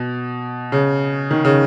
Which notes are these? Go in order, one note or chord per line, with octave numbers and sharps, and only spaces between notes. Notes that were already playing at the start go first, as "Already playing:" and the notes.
Already playing: B2
C#3
D#3
C#3